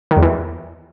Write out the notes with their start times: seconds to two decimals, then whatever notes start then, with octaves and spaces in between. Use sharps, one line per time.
0.11 D#3
0.17 E2
0.22 E3